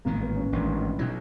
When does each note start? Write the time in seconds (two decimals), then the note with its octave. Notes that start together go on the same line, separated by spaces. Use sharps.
0.05 A1 G#2 D#3 A#3
0.21 B3
0.36 C#4
0.52 A1 G#2 D#3 D4
0.76 D#4
0.92 E4
0.99 B2 F#3 D#4